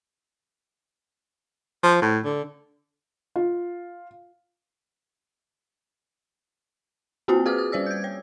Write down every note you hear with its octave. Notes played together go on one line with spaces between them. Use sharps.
F3
A2
D3
F4
A#3 C4 F4 F#4 C5 G#5
G#4 B4 D6 D#6 F6
D#6
G3 C5 D5 E6
G6 G#6
C#5